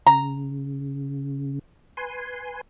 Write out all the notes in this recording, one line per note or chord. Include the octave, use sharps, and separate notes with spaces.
C#3 A#5
B4 G#5 C6